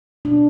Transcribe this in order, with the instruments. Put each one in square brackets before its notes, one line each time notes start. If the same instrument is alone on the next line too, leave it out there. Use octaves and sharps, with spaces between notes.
[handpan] B2 D4